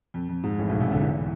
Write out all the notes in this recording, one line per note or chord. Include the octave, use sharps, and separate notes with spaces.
F2
F2
G#2
A1 A2
B1 B2
C2 C3
D2 D3
E2 E3